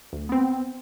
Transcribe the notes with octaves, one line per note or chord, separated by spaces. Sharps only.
D2
B3 C4